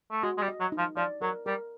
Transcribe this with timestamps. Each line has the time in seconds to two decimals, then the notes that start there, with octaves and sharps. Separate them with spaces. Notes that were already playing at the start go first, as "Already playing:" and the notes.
0.11 A3
0.23 G#3 F#4
0.38 G#3
0.42 G3
0.48 D#5
0.60 F#3
0.72 D#4
0.78 F3
0.96 F3 D5
1.22 F#3 A#4
1.46 G3 A#4